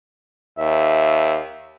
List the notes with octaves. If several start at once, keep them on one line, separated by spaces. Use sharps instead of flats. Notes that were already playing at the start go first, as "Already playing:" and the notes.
D#2 E5